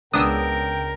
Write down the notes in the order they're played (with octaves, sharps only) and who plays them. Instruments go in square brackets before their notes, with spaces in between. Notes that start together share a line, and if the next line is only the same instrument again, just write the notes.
[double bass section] C#2 C#3 [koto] B3 D4 [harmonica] A#4 G5 [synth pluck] D#6 E6